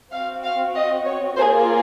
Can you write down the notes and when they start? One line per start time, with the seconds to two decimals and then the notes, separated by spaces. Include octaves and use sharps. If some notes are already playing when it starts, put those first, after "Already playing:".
0.13 C4 F#4 F5
0.44 F5
0.76 D#5
1.06 C#5
1.38 A#3 F4 G#4 C5